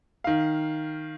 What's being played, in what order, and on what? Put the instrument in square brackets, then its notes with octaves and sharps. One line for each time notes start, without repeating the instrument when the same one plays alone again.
[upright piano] D#3 F5